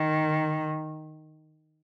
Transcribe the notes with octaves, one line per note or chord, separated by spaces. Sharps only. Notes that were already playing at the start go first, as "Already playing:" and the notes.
Already playing: D#3